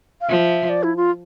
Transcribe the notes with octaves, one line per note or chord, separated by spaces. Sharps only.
F5
F3 E5
D5
E4
F4